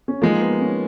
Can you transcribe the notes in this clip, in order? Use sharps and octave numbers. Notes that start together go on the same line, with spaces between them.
C#4
F3 G#3 A#3 D#4
B3
C#4